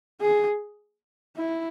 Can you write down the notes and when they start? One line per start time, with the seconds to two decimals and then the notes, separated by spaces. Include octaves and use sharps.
0.20 G#4
1.36 E4